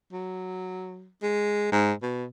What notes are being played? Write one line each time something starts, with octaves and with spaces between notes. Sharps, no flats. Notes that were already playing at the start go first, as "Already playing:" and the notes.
F#3
G#3
G#2
B2